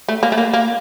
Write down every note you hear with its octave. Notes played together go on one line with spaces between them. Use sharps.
A3
A#3
A3
A#3
A#3